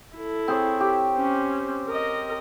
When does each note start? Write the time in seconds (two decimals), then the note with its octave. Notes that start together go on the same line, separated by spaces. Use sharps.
0.16 E4 A4
0.48 C4 G#4 C#5
0.80 G4
1.14 C#4 C5
1.88 A#4 D#5